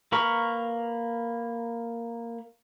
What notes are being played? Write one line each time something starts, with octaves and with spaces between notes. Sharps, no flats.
A#3 B4 A#5 C#6 F6